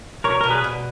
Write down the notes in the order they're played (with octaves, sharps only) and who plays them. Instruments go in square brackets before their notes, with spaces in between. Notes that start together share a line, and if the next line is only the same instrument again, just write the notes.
[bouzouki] B2 [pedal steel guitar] A#4 C#5
[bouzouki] B2 [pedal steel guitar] A#4
[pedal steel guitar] G#4 B4
[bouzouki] B2